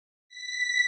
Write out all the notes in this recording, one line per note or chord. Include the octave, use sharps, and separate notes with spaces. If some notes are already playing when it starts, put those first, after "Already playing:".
B6